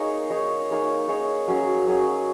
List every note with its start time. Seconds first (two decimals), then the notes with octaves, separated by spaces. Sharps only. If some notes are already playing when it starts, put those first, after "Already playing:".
Already playing: A#3 D#4 G#4 C#5
0.30 A#3 D#4 G#4 C#5
0.70 A#3 D#4 G#4 C#5
1.08 A#3 D#4 G#4 C#5
1.48 F#3 C#4 G#4
1.87 F#3 C#4 G#4